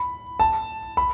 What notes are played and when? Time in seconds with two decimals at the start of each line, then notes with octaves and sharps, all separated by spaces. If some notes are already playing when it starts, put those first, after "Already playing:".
Already playing: B5
0.40 A5
0.97 B5